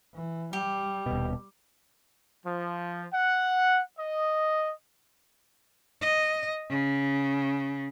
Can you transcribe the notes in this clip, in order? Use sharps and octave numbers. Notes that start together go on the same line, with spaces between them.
E3
G3 G4
D#1 B2
F3
F#5
D#5
D#5
C#3